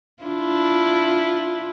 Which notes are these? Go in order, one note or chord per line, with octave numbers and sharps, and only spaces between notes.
D4 E4 F4